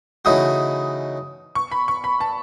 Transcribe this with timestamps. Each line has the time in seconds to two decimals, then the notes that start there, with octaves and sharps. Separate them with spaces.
0.25 C#3 E3 A3 D#4 F#4 D#6
1.55 C#6
1.71 B5
1.88 C#6
2.04 B5
2.21 A5